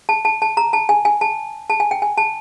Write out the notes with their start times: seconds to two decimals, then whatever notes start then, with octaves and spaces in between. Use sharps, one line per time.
0.09 A5
0.25 A5
0.42 A5
0.57 A#5
0.73 A5
0.89 G#5
1.05 G#5
1.21 A5
1.70 A5
1.80 G#5
1.91 G5
2.02 G#5
2.18 A5